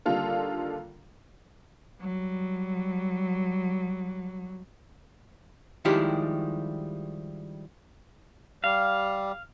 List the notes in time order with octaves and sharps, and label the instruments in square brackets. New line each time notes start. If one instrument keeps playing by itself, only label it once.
[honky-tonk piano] D3 D#3 G3 A#3 F4 A4
[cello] F#3 G3
[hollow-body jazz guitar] D#3 F3 G3 G#3 E4 G4
[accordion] G3 [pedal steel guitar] F5